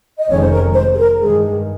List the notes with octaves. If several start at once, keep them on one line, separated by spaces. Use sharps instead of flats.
D#5
F1 F2 D#3 G#3 C#4 C#5
C5
A#4
C5
G#4
A#4
G2 D#3 G#3 G#4